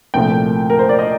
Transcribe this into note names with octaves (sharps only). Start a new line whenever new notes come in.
C2 A#2 F3 A3 G5
A#4
C5
D5
D#5